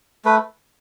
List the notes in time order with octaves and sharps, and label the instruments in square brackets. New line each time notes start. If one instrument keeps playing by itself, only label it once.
[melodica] A3 B4